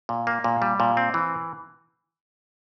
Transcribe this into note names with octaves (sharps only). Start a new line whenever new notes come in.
A#2
A#3
A#2
G3
A#2
C4
E3